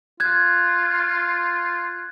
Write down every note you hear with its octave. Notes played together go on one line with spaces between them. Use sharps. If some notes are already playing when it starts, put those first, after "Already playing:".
F4 F#6 G#6